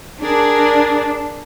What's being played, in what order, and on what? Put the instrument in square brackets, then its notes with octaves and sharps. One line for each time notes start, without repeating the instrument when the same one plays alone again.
[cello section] D4 [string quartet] G#4 A#4 D5